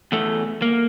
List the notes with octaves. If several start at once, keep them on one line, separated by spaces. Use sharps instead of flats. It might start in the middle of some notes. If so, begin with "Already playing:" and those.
E2 A3
A#3